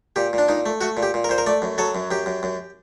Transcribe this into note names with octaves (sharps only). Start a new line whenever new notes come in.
A#2 G4
A#2 D4
A#2 D#4
A3
A3 F#4
A#2
G4
A#2
A#4
A#2 C5
A#4
A3 D5
F#2
F#3 A4
F#2
F#2 G4
F#2
F#2